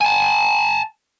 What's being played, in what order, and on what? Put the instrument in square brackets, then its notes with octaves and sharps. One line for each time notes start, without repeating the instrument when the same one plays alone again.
[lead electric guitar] G#5 A5